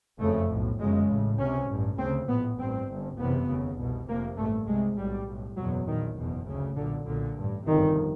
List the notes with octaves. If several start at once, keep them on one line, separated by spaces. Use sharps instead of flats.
F#1 F2 C#3 A3
B1 A2
G1 F#2 C#3 G#3
A1 A2
C#2 C3 C#4
A1 G2
D2 C#3 C4
A#1 A2 B3
A1 G2 C4
G1 G2
F#1 E2 C3 B3
F1 D#2 C#3
C2 B2
F1 F2 C3 A#3
A1 G2 A3
C2 C3 G#3
B1 A2 G3
B1 A2
F#1 E2 B2 F#3
A#1 A#2 D#3
F#1 E2 B2
D2 C#3
B1 A#2 D3
B1 A#2 D3
A1 G2
G1 F2 C3 D#3